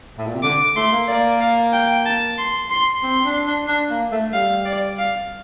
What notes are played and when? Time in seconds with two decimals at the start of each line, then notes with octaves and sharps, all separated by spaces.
0.18 A2
0.26 A#2
0.35 C3
0.43 D3 D6
0.76 A3 C6
0.92 A#3
1.08 A#3 D5
1.41 F5
1.73 G5
2.06 A5
2.38 C6
2.70 C6
3.03 C4 C6
3.25 D4
3.46 D4
3.68 D4
3.90 A#3
4.12 A3
4.33 G3 F5
4.65 D5
4.99 F5